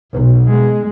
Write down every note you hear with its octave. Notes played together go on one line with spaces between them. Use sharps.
B1
G#3